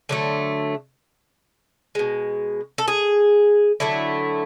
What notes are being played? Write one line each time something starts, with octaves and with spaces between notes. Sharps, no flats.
D3 F#3 A3
B2 G#3
A4
G#4
D3 F#3 A3 E4